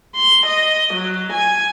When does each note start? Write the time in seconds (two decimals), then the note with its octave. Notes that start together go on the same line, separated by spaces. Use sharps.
0.15 C6
0.47 D#5
0.94 F#3
1.33 G#5